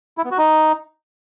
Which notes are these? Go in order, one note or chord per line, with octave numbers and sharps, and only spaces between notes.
E4
B3
F#4
D#4